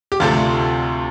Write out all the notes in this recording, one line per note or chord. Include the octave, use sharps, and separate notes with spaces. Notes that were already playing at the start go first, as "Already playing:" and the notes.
G4
D2 C3 F3 A3 F4